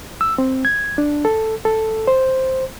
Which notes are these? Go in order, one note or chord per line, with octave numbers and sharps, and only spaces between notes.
E6
C4
G#6
D4
A4
A4
C5